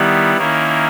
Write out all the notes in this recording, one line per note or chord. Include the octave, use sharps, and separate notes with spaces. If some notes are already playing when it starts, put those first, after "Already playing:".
Already playing: D#3 G3 B3 E4
D#3 A#3 C#4 E4